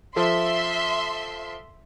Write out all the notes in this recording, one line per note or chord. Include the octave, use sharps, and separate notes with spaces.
F3 A4 E5 C6